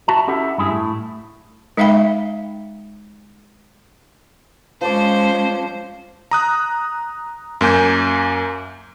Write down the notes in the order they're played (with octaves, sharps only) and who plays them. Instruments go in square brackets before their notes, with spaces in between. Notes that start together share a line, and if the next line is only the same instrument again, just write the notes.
[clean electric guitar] F#4 E5 A5
C#4 E4 G4 A4 E5 F#5
G2 E4 G#4
A2
[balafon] G#3 D#4 E5 F5 G5 B5
[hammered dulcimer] F3 A5 D6 [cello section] G#3 C#4 [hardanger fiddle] C5
[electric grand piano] A#5 D#6 F#6
F#2 A#3 G#5 G6